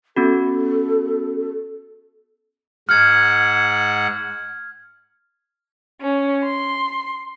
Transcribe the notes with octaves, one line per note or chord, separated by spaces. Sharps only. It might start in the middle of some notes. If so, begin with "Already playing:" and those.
B3 C#4 F#4 A4
G#2 F#5 F6 G#6
C#4
C6